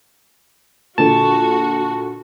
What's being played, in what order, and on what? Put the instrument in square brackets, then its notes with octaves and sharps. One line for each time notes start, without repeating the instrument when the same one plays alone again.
[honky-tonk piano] A#2 D3 [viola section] F#4 [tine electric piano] A5